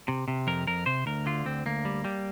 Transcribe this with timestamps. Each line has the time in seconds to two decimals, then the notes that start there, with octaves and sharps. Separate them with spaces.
0.08 C3
0.28 C3
0.47 F2 A#4
0.67 F2 A#4
0.86 C3 C5
1.06 D2 A#4
1.26 D3 F4
1.46 D2 C4
1.66 D2 A#3
1.85 G3
2.05 G3